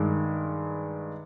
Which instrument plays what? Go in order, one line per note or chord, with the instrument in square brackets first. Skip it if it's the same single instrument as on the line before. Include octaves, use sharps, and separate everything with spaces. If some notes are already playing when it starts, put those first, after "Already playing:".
Already playing: [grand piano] G2 D#3 G#3